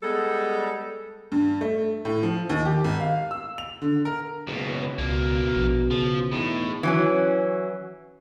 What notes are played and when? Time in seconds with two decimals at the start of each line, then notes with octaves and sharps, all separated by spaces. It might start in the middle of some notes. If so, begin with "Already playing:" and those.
0.03 G3 G#3 B3 A4
1.32 G2
1.61 A3
2.05 A2
2.23 F3
2.49 D#2
2.65 G4
2.84 G#1
3.00 F5
3.31 E6
3.58 F7
3.82 D3
4.05 A#4
4.47 F#1 C#2 B2
4.98 C#2 G2 B2 A#3
5.56 A#1
5.90 C#3 F3
6.32 E2 A2 D#4
6.83 E3 F#3 C#4